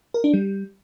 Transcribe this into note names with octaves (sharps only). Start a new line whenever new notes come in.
A#4
D4
G3